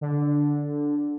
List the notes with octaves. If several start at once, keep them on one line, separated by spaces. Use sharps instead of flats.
D3